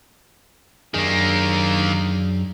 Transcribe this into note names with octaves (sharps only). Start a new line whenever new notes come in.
F#2 D#3 A#3 D4 G#4